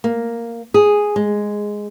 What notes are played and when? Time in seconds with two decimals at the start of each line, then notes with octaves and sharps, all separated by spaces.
0.04 A#3
0.74 G#4
1.16 G#3